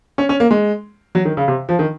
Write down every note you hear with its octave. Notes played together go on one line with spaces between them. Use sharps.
C#4
C#4
A#3
G#3
F#3
D#3
C#3
C3
F3
D#3